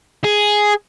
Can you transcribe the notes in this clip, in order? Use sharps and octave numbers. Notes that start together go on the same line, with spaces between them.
G#4